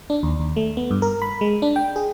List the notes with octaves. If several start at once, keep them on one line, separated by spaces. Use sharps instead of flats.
D4
D#2
D#2
A3
B3
G2
A#4
B5
G#3
D4
G5
G#4